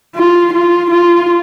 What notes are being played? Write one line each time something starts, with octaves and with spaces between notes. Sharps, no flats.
F4
F4
F4